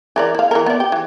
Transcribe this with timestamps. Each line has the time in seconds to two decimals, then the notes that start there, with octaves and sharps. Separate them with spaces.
0.16 E3 A#4 D5
0.35 E4 F5
0.51 E3 E4 A#4
0.66 B3 D5
0.80 G4
0.92 E3